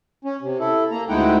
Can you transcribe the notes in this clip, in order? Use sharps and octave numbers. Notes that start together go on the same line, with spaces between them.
C#4
C3
E4 A4
A#3 A#5
D2 G#3 D#4 E4 F#5 G5